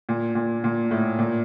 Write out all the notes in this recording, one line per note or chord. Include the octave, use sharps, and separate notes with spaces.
A#2
A#2
A#2
A2
A#2